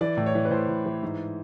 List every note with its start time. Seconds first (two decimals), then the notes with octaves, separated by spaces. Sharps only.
0.01 E3 D5
0.17 A2
0.26 C#5
0.35 E3
0.45 B4
0.51 A2 C5
0.68 A2
0.86 E3
1.03 G#2